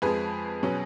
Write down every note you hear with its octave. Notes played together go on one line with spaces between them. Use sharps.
F2 F3 G#3 G#4 B4
B2 F#3 C#4